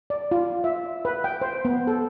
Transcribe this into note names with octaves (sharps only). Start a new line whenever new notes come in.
D5
F4
E5
B4
G5
C5
B3
A4